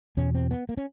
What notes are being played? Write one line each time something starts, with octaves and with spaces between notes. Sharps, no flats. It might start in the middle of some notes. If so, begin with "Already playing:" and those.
E2 B2 C#4
C4
B3
A#3
C#4